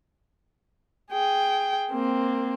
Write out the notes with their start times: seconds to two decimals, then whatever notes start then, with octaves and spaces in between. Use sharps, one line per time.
1.12 G#4 G5
1.91 A#3 C4